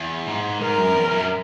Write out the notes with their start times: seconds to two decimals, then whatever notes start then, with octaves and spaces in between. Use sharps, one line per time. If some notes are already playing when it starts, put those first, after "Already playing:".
Already playing: E2
0.27 G#2
0.60 G#2 A#4
0.77 F#2
0.94 E2
1.11 F#2